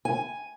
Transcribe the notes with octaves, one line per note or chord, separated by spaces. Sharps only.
G#5